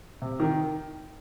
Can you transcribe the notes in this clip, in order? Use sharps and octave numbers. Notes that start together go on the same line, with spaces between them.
C3
D#3